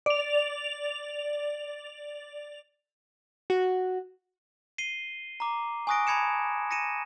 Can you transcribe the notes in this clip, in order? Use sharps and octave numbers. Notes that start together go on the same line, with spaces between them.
D5 F7
F#4
C7 D#7 G7
A#5 D6
G#5 C#6 D#6 F#6 A#6 D7
A5 B5 G#6 C#7 E7
A#6 C#7 D#7 E7